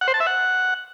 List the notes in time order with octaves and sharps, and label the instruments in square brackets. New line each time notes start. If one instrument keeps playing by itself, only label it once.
[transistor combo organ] F#5
C5
A5
E5
F#5